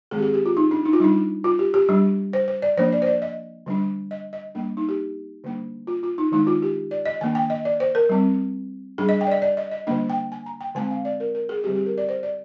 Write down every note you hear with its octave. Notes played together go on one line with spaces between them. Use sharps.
D#3 G#3 C4 G#4
G4
G#4
G4
F4
D#4
D4
D#4
F4
G3 D4 D#4
F4
G4
G4
G3 D4
C5
C5
D5
F3 A#3 D4 C5
D5
C5
D5
D#5
D3 G3 D4
D#5
D#5
G3 A#3 D4
D#4
G4
D3 G3 A#3 D4
F4
F4
D#4
D#3 G#3 D4 D#4
F4
G4
D5
D#5
D#3 A#3 D4 G#5
G5
D#5
D5
C5
A#4
G3 C4
G3 D4 G#4
D#5
G5
D5
D#5
D5
D#5
D#5
D3 G3 A#3 D4 D#5
G5
G#5
A#5
G5
D3 G#3 C4 G#5
F5
D5
A#4
A#4
G#4
D3 G3 C4 G4
G4
A#4
D5
C5
D5